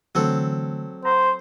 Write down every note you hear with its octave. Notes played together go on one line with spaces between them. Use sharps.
D3 E3 F#3 A3 C4 A4
C5 F#5 A#5